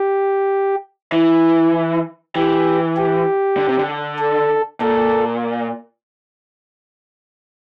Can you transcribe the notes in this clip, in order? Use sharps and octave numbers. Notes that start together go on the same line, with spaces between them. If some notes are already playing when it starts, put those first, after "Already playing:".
Already playing: G4
E3 E4
E3 G4
G4
D3
C3
D3
A4
A#2 A4